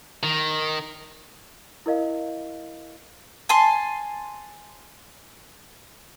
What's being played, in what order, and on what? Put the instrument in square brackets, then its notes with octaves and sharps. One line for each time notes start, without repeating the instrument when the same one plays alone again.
[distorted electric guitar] D#3
[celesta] E4 A#4 D#5 F5
[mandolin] G#5 A5 C6